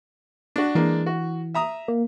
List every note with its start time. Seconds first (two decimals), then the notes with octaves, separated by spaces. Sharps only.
0.56 D4 F#4
0.75 E3 G#3 A#3 D4
1.06 F#4
1.54 E5 A#5 D#6
1.88 A#3